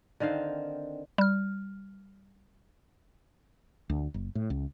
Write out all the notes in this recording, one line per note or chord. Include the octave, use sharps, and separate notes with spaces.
D3 D#3 C4 F5
G3 F6
D2
F#1
A2
C#2